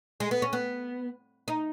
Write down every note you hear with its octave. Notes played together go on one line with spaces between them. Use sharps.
G#3
B3
C#4
B3
D#4